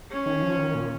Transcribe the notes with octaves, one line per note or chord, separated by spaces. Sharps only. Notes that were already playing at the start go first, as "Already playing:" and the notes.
C#4
D#3
F3
D#3
A#2